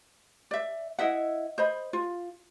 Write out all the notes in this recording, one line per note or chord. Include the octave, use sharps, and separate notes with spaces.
D5 E5
E4 D#5 E5 F#5
C5 D#5 B5
F4